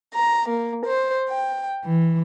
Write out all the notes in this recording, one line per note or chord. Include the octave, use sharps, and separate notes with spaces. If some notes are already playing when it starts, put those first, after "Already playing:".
A#5
A#3
C5
G5
E3